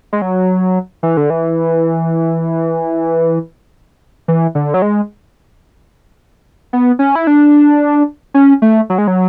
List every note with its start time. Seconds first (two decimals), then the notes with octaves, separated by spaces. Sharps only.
0.13 G#3
0.22 F#3
1.03 E3
1.17 D3
1.30 E3
4.28 E3
4.55 D3
4.74 F#3
4.82 G#3
6.73 B3
6.99 C#4
7.15 E4
7.27 D4
8.34 C#4
8.62 A3
8.90 F#3
8.98 G#3
9.07 F#3